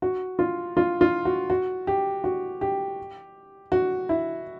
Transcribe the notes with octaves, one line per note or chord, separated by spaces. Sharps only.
F#4
F4
F4
F4
F#4
F#4
G4
F#4
G4
F#4
E4